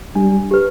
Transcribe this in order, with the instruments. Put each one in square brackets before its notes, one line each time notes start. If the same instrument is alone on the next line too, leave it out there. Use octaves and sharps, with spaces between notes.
[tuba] G3 [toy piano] D4
[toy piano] G4 B4